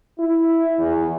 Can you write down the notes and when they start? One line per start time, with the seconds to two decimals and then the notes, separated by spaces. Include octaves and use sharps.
0.18 E4
0.78 E2